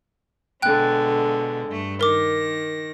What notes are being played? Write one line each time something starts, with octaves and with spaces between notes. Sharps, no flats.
B2 D3 G#3 G5 F#6
G2 A3
D#3 A#4 D6 A#6